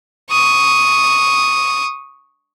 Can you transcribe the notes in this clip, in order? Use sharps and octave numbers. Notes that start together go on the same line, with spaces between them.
C#6 D#6